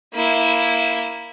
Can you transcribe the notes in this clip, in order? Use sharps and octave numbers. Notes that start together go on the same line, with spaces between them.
A#3 E4